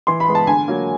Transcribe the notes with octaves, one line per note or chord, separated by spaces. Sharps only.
E3 C6
B5
G#3 B3
A5
D3 G#5
F#3 A#3